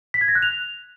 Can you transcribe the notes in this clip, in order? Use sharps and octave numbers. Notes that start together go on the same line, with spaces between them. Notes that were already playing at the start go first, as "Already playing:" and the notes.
B6
G#6
A#6
F#6
F7